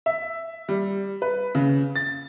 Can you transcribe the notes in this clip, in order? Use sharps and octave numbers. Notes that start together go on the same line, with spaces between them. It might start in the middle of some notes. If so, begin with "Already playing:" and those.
E5
G3
B4
C#3
A6